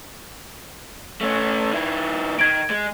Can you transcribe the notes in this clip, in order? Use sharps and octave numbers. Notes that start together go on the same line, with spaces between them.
A3 C#4
D#3 E4
D#3 G#6 D7
G#3